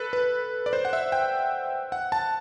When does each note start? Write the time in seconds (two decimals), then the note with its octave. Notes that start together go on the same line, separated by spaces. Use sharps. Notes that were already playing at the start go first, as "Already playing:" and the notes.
Already playing: A4 B4
0.13 B4
0.66 D5
0.73 C5
0.85 F#5
0.93 E5
1.12 G5
1.92 F#5
2.12 A5